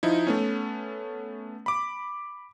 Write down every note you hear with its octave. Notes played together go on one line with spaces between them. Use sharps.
F3 D#4 E4
A3 B3 C#4
B5 D6